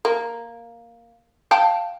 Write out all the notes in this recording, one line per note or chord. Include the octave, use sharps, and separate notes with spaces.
A#3
F5 G5 A5